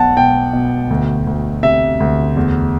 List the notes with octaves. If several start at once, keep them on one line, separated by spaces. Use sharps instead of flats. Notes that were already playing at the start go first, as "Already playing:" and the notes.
Already playing: B1 B2 F#5 A5
B2 G5
B2
D2
D2
C3 E5
D2
E2